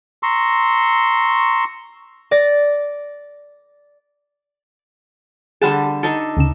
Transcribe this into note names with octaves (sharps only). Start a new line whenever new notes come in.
A#5 C6 C#6 E6
D5 A6 A#6
D3 G3 G#4 F#5 A5
D4 D#4 A4
D2 C#3 E7